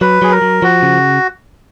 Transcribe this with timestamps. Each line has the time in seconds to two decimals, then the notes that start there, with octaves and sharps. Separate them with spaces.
0.01 F#3 B4
0.22 F#3 G#4
0.32 A#4
0.42 F#3
0.62 F3 F#4
0.83 C#3